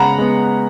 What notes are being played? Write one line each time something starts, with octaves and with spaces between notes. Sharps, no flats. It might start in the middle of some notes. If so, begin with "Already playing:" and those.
Already playing: C#3 G#3 B3 F#5 A#5 B5
G#3 B3